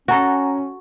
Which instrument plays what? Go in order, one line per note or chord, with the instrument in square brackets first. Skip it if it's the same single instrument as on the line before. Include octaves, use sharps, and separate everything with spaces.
[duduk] C#4 [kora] F#4 A4 [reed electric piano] F#5 G#5 A#5